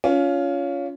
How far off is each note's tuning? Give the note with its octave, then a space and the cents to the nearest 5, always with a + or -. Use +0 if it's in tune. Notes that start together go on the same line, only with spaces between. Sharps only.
C#4 +25 F4 +0